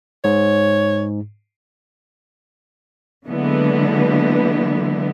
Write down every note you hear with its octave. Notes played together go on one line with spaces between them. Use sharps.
G#2 C#5
D3 E3 F#3 G#3 A#3 B3